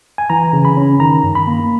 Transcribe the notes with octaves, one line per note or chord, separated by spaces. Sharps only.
G#5
E3 A#5
C#3
B5
C#4
D#3 A#5
G2
B5
A#3